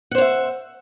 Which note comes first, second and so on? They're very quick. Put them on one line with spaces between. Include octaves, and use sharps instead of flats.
F#5 C5 C#5 E5